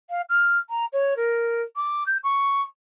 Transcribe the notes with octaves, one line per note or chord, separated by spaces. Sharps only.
F5
F6
A#5
C#5
A#4
D6
G6
C#6